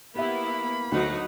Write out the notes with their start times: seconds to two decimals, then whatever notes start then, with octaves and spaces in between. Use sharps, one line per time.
0.16 A#3 B3 E4 G4 E5 B5
0.92 D2 F#3 D#4 F#5